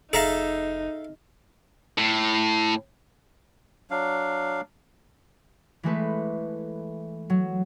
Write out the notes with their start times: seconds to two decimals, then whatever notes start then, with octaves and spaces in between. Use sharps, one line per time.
0.13 F1 D#4 G#4 A4 E5 F5 A#5 A#6
1.98 A2
3.91 F#3 D4 F5
5.83 E3 G#3 A3 B4
7.30 F#3